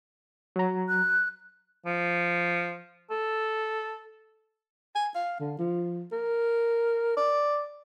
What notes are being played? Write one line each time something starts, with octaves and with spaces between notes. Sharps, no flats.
F#3 A#5
F#6
F3
A4
G#5
F5
D3
F3
A#4
D5